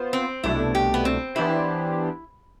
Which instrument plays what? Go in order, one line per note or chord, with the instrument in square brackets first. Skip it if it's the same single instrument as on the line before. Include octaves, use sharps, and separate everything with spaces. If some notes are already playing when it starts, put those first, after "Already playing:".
Already playing: [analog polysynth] B3 F4 C5
[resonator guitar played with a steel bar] C4
[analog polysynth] C2 B2 A3 D4 [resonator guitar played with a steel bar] E4
[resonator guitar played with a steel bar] G4
B3
C4
[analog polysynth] E3 B3 D4 G4 C5 [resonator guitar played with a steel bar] E4